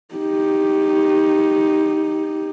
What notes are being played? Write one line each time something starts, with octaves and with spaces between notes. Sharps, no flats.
D#4 G4